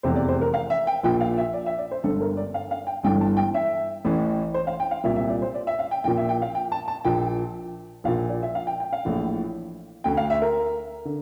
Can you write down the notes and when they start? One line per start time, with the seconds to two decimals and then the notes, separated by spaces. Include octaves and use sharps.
0.03 F1 E2 C3 C5
0.16 D5
0.28 C5
0.41 A#4
0.54 F5
0.70 E5
0.87 G5
1.03 A#1 A#2 G5
1.20 F5
1.38 E5
1.53 D5
1.66 E5
1.78 D5
1.91 C5
2.04 G1 G2 D3 A4
2.21 A#4
2.37 D5
2.54 F5
2.71 F5
2.87 G5
3.03 G1 G2 E3 G5
3.21 A5
3.37 G5
3.54 E5
4.05 A1 A2 E3
4.54 C5
4.67 F5
4.80 G5
4.91 F5
5.04 C2 A#2 E5
5.16 E5
5.29 D5
5.42 C5
5.54 D5
5.67 E5
5.79 F5
5.91 G5
6.04 A#1 A#2 G5
6.17 E5
6.29 G5
6.42 F5
6.55 G5
6.72 A5
6.88 A5
7.05 A#1 A#2 G5
8.04 A#1 F5
8.08 A#2
8.29 D5
8.43 E5
8.55 F5
8.67 G5
8.80 G5
8.93 F5
9.05 A#1 A2 E3
10.04 D2 D3 G5
10.17 F5
10.30 E5
10.42 A#4
11.05 D3